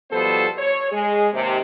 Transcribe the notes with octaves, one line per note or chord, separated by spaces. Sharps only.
B2 F3 G3 B3 A4 C5
C#5
G#3 G#4
D#2 C3